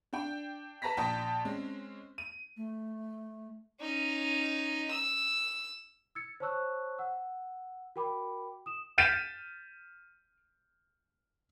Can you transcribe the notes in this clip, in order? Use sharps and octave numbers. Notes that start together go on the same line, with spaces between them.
D4 G5
B4 A5 A#5 A#6 B6
A#1 G5 A5 D#6
G#3 C4 C#4
D#7
A3
C#4 D#4
E6
E6 G#6 A6 C#7
C5 C#5 A5 C#6 E6 F#6
F#5 E6
F#4 A#4 G5 B5 D6
D#6 E7
F6 G6 A6 B6 D#7 E7